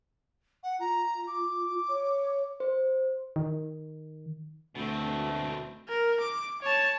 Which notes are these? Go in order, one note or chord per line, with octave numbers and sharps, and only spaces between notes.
F#5
F4 A#5
D6
C#5
C5
D#3
D2 B2 A3 C4
A#4
D6
C#5 A5